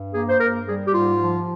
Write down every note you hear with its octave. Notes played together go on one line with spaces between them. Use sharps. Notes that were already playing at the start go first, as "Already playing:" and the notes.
Already playing: G2
A#3 G#4
C5
G2 A#4
G3 G#4
G4
G#2 F4
F3